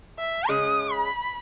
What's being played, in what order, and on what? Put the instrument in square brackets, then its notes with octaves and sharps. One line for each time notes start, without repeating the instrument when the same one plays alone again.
[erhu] E5
[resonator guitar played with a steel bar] C#3 G#3 C#4 G#4 [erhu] D#6
[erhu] B5